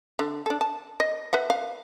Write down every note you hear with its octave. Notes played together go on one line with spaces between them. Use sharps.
D3
D4 A4
A5
D#5
B4 E5 F#5
F5